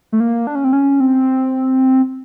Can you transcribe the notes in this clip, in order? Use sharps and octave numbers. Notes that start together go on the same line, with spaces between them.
A3
A#3
D4
C#4
C4
C#4
C4